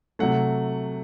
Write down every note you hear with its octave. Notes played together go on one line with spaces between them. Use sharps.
C3 F#3 A3 F#5